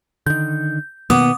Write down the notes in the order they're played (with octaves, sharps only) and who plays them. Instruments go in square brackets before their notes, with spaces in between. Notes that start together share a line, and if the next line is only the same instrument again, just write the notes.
[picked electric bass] D3 D#3 [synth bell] G6
[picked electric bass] B2 D#3 A#3 [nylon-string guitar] B3 [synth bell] D6 D#6